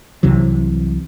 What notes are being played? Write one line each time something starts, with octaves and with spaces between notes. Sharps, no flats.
C2 C3 E3 F#3